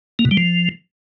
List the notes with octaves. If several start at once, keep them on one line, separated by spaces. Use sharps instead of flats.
A#3
B2
G3
F3